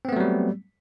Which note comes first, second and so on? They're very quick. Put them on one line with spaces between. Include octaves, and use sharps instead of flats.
C4 B3 A3 F#3 G3